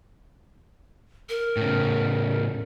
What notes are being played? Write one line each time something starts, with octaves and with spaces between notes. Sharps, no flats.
A#4
A2 C#3